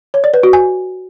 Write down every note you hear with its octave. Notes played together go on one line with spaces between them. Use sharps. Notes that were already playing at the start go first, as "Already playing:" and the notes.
C#5
D5
B4
F#4
G#5